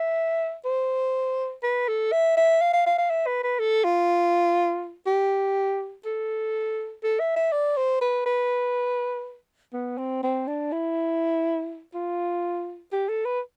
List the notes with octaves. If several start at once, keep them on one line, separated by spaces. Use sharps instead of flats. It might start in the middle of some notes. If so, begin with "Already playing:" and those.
Already playing: E5
C5
B4
A4
E5
E5
F5
F5
F5
F5
E5
B4
B4
A4
F4
G4
A4
A4
E5
E5
D5
C5
B4
B4
B3
C4
C4
D4
E4
F4
G4
A4
B4